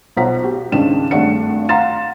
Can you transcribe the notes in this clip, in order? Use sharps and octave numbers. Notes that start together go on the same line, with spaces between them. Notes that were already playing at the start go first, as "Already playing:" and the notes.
B1 F4 C5 F#5 A#5 B6
F#4 G4
C#2 G#2 D#3 D4 E7
G#1 G2 A3 D4 F#5 C#7
F5 F#5 A#5 C6 A6 E7